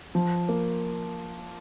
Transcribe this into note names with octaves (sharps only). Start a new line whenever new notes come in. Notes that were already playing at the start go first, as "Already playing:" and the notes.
F3
A#3